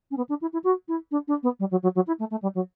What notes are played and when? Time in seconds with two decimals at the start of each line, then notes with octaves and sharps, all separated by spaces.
0.10 C#4
0.17 B3
0.29 D4
0.41 E4
0.52 E4
0.63 F#4
0.88 E4
1.11 D4
1.27 D4
1.43 B3
1.59 G3
1.70 F#3
1.82 F#3
1.95 F#3
2.07 E4
2.19 A3
2.30 A3
2.42 G3
2.54 F#3